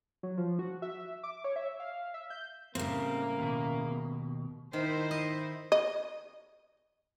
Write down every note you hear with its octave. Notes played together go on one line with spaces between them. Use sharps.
F#3
F3
F#4
E5
D6
C#5
E5
F5
E5
G6
A2 C#3 G3 A#3 C4
D#2 B2
D#3 D#4 E4 C5
D#5
D#5